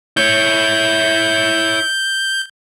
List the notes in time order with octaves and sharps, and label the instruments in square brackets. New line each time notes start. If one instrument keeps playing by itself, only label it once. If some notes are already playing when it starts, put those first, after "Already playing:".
[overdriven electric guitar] E4 C#5 [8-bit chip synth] G6